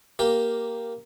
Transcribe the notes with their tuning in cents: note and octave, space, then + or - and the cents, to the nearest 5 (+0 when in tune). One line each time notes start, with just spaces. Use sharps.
A#3 +0 G4 +0